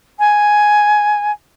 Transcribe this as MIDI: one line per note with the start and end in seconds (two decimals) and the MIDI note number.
0.19 1.31 80